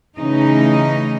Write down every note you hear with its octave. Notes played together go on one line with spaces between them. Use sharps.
C#3 E3 A3 C#4 D#4 D#5